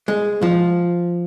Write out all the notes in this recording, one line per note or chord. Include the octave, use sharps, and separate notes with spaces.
G#3
F3